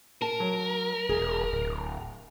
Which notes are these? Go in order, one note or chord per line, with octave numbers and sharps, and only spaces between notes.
A#4 A5
F#3
E1 G#4
D1